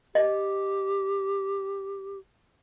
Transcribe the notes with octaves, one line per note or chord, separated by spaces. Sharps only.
G4 D#5